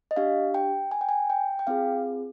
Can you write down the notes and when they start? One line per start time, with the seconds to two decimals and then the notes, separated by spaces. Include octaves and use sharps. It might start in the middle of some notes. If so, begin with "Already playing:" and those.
0.11 D#5
0.16 D4 G4 F5
0.54 G5
0.91 G#5
1.01 G5
1.09 G#5
1.30 G5
1.59 G5
1.67 C4 F4 G#4 F5